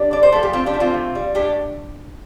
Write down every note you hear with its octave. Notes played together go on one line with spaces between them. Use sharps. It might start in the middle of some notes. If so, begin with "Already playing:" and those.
Already playing: D4 G4
D3 D5
C5
F3 A3 A4
G4
D3 C4 F4
D4 G4
F3 A3
C4 F4
C3
G3
A2 D4 G4